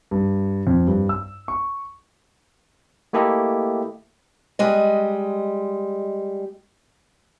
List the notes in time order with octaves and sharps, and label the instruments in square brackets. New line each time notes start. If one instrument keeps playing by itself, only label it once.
[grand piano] G2
F2
G2
E6
C#6
[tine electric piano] A3 A#3 E4 G4 A4 D#5
[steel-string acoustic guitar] G3 G#3 D#5